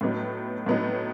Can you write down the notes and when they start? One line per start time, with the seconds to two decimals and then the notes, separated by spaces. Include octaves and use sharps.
0.01 A2 F#3 B3 D#4
0.66 A2 F#3 B3 D#4